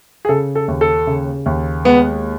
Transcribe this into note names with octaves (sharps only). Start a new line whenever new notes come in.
G#4
C#3 A4
A4
D#2
A4
C#3
D#2
G#3 B3